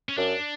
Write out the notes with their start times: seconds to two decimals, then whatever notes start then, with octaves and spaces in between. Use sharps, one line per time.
0.09 C#4
0.17 F#2 D4